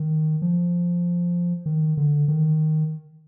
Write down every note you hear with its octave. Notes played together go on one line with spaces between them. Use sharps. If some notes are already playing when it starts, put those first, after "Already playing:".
Already playing: D#3
F3
D#3
D3
D#3